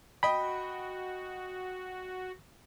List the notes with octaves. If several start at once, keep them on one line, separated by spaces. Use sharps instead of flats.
F#4 D#5 G5 B5